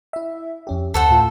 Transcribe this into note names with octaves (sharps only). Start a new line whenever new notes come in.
E4 E5
F2 C#4 G4
D2 A4 C5 F#5
A2 F4